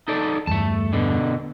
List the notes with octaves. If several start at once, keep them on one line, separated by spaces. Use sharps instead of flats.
D#4 A4 D5
E2 G2 A3 A5
B2 D3